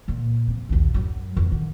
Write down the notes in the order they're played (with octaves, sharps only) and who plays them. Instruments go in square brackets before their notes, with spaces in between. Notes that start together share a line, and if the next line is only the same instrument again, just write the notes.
[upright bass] C#2 A#2
F2 C3
A#1 D#2
F#2 F#3
F2 E3
D3 D#3